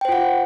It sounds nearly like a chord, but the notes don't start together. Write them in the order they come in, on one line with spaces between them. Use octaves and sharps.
G5 C5 F4 F#5